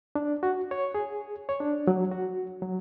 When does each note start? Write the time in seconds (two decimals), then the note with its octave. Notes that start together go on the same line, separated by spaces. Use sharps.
0.15 D4
0.43 F#4
0.71 C#5
0.94 G#4
1.49 C#5
1.60 D4
1.87 F#3
2.12 F#4
2.62 F#3